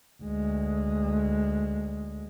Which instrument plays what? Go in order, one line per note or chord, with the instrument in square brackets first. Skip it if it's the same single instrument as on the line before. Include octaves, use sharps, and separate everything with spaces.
[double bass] D2 G#3